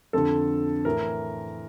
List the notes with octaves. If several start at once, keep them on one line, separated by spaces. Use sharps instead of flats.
F2 D3 A4
A2 E3 A#4